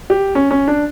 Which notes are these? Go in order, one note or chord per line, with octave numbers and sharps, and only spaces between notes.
G4
C#4
C#4
D4